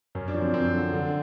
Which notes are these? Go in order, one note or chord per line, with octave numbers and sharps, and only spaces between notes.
F#2 C#4
D4
F3
C4
F#2 C4
D3
D3